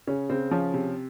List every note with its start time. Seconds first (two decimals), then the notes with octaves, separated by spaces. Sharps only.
0.07 C#3 C#4
0.30 C#3 C4
0.51 F3 C#4
0.74 C3